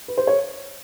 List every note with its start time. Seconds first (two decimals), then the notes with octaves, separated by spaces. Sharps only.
0.08 B4
0.18 C5
0.27 C#5